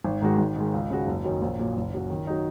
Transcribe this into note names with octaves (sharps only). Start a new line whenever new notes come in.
G#1
G#2 D#3 G#3 F#4
G#1
G#2 D#3 G#3
C#2
C#3 G#3 F#4
F#1
F#2 D#3 F#3 D#4
A#1
A#2 F#3
F#1
F#2 F#3 C#4 F#4
D#3
F#3 D#4